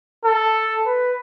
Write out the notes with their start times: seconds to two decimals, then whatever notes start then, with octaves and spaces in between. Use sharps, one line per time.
0.25 A4
0.86 B4